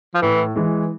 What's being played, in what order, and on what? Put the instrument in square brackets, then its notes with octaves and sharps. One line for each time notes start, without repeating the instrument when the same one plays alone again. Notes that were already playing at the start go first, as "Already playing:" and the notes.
[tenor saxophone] F3
[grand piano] A2 [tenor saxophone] E3
[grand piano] E3 G#3